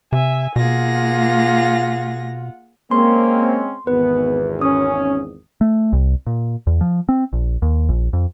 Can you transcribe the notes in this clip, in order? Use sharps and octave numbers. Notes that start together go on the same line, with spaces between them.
C3 E5 G#5
B2 A#3 F4 G#4 F#5 A#6
G#3 A#3 C4 C#4 C6
G#1 E2 B3 B4
C#4 D#6
A3
C2
A#2
E2
F3
C4
A#1
D#2
A#1
F2